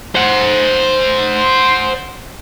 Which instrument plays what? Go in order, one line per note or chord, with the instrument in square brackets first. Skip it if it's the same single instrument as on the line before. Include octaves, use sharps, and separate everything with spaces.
[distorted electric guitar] C5 F#5